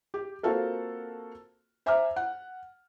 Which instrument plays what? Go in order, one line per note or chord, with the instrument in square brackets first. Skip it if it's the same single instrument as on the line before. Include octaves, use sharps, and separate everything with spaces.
[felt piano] G4
A#3 C4 F4 F#4 A4 A#4
C5 E5 G#5 A#5 D6 F6
F#5